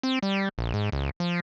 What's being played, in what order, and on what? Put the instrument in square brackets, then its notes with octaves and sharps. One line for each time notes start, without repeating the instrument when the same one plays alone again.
[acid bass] C4
G3
A#1
G#2
C#2
F3